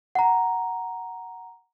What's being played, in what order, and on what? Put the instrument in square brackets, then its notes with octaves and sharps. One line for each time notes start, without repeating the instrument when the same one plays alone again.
[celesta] F#5 A#5